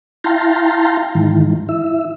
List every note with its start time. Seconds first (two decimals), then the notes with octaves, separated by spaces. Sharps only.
0.24 E4 F5 G5 A5 A#5 C6
1.15 G#2 D#3 E3
1.69 E4 E5